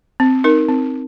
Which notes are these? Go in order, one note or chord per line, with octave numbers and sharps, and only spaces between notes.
C4
D#4 A#4
C4